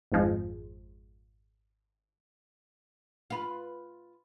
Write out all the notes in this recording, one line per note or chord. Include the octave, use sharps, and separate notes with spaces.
G#1 F2 F3 G#3
F4 B4